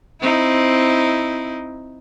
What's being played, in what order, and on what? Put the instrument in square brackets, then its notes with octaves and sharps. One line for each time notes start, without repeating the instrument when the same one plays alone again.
[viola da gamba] C4 D#4 E4